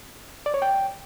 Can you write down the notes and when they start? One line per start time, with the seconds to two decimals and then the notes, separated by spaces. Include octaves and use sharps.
0.46 D5
0.54 C#5
0.62 G5